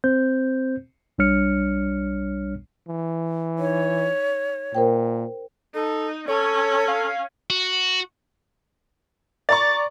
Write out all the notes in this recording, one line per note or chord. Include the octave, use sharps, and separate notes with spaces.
C4 C5 G6
B1 G3 D4 C#5 F6 C#7
E3
D#4 C#5
A#2 A#4 C5 G5
D#4 A4
C#4 A4 C#5
F5
F#4
D5 A#5 C#6 A6